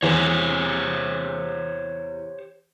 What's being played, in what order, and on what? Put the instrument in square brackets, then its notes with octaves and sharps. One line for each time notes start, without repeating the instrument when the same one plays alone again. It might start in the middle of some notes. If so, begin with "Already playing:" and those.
[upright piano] E2 [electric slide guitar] G4 C5 C#5